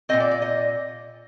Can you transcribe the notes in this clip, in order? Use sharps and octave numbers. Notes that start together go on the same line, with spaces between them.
A#2 G#3 C4 D#5
D5
D5
D#5